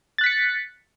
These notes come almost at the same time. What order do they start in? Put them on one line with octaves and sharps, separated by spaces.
A6 F#6 B6 C#7